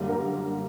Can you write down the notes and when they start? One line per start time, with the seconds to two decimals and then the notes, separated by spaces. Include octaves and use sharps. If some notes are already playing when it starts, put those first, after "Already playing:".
Already playing: F#2 D3 G3 A#3
0.09 A#4